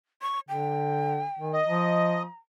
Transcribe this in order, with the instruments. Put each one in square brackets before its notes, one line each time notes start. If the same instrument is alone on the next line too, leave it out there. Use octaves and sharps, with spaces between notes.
[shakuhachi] C#6
[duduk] D3 [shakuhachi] G5
[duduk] D#3
[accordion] D#5
[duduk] F3 [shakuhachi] A#5